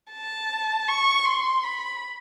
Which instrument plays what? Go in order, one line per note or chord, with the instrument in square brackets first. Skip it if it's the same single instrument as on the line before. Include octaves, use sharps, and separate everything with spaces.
[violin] A5
C#6
C6
B5